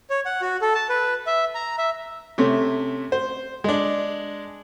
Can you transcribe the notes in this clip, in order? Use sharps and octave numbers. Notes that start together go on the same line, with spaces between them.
C#5
F#5
F#4
A4
A5
B4
E5
A#5
E5
C3 A3 C#4
C5
G#3 D4